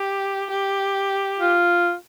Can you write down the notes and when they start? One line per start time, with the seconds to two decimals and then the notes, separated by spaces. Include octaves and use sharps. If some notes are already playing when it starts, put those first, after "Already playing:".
Already playing: G4
0.51 G4
1.40 F4